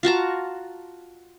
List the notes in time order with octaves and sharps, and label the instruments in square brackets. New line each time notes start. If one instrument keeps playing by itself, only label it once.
[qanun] F4 F#4 A5 A#5